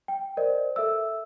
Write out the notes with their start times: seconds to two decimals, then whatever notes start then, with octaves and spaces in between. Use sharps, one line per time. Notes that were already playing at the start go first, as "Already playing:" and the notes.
0.08 G5
0.37 A#4 C5 D5 D#5
0.76 A4 E5 E6